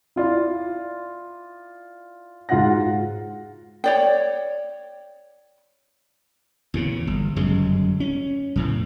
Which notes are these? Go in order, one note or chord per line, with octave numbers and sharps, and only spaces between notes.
E4 F4 D5
G#2 F4 F#4 F#5 A#6
C#5 D5 G5
E2 A#2 C#3
G1
G1 F#2 C#3 G#3
C#4
E2 A2 C#3